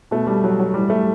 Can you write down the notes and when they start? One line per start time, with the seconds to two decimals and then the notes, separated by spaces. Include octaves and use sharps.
0.11 B2 A3
0.27 G3
0.44 F#3
0.60 F#3
0.74 A2 E3 G3
0.90 A3